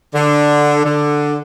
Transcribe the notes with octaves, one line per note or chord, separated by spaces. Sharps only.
D3
D3